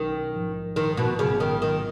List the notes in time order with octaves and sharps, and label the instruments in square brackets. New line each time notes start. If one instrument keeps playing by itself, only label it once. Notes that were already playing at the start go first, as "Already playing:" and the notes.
Already playing: [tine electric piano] B1 B2 F#3 C#4 [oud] D#3
[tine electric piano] A#1 G#2 F3
[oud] D#3
B2
[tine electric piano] G#1 G#2 F#3 B3 F4 [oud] C#3
[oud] D#3
D#3